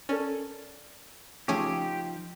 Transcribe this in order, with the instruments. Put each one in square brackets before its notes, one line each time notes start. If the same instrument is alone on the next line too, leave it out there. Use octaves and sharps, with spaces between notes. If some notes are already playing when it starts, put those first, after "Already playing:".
[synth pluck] C#4 [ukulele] A4 A#4 D5
[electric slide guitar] F3 D#4 F4 [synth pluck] A3 C#4 G#4 [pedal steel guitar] G4